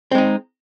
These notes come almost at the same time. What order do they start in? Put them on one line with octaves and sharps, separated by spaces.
C4 G#3 D#4